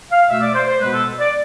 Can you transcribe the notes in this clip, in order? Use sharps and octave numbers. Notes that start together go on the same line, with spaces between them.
F5
B2 A3 E5
D5
C5
C5
B2 G#3 B3 B4
A4
D5